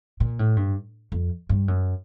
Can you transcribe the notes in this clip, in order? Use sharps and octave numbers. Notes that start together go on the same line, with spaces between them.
A#2
A2
G2
F2
G2
F#2